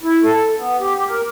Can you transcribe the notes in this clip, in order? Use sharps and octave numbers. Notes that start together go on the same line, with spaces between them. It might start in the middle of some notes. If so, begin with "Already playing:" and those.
E4
A4
B3
G4
G4
A#4